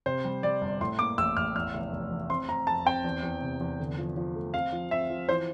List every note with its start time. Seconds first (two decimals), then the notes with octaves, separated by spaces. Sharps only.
0.06 C3 C5
0.25 G3
0.43 G3 D5
0.61 G1
0.81 A2 C6
0.99 A#3 D6
1.18 A1 E6
1.37 A1 F6
1.56 E2 F6
1.74 F1
1.92 F1
2.11 E2
2.30 C4 C6
2.49 C4 A#5
2.67 F2 A5
2.85 C4 G5
3.04 E2
3.23 E2
3.42 C3
3.60 E2
3.79 D3
3.98 F3
4.17 F3
4.36 A3
4.54 C4 F5
4.72 F3
4.91 C4 E5
5.10 F3
5.29 E3 C5